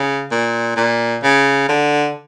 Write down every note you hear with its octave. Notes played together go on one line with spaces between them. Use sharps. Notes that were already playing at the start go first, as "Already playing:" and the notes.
Already playing: C#3
A#2
A#2
C#3
D3